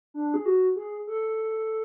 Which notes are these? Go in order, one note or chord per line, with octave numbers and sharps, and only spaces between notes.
D4
G#4
F#4
G#4
A4